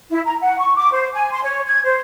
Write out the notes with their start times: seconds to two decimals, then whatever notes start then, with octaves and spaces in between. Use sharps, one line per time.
0.10 E4
0.25 A#5
0.41 F#5
0.58 C#6
0.76 D6
0.93 C5
1.13 G#5
1.32 C6
1.44 C#5
1.66 G#6
1.84 C5